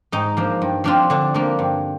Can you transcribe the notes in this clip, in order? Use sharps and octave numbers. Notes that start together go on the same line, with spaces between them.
G#2 D#4
F3 A#3 D4
G2
F3 C4 D4 F4
D3 D4
F3 A#3 D4
G2